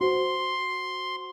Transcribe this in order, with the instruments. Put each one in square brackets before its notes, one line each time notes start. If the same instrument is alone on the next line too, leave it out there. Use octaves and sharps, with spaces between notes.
[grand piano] F#4 C5 [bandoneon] C6